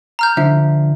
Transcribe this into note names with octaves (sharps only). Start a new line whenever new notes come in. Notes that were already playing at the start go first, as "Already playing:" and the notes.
A#5 F6 G6
D3 F3 E5